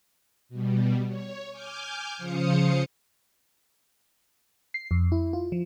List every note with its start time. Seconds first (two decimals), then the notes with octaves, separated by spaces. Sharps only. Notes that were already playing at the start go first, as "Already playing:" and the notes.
0.49 B2 G3
1.08 C#5
1.50 G#5 D6 F6 G6
2.16 C#3 F3 C5 F5 D#6 C#7
4.74 C7
4.91 F2
5.12 E4
5.33 F4
5.52 F3